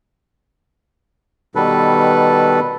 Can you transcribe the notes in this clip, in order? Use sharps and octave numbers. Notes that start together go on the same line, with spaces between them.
B2 D#3 G3 A4 B4